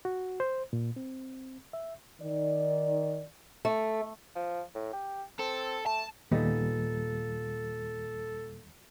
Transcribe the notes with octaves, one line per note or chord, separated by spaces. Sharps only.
F#4
C5
A#2
C4
E5
D#3 D#4 D5
A3
F3
A2
G4
C4 A4
A3 A5
D#2 A#2 G3 B3 D#4 A4